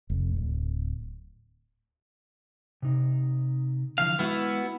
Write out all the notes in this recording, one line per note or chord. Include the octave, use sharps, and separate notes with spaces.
F1
D1
C3 D#4
D3 E3 F3 F5
G#3 B3 E4 F#4